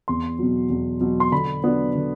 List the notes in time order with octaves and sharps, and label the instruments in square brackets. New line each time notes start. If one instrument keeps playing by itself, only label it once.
[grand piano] E2 C6
B2 F#3
E2
B2 F#3
C6
D3 B5
F#3 B3 D4
D3